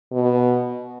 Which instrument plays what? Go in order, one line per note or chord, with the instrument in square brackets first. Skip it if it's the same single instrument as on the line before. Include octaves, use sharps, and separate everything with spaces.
[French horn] B2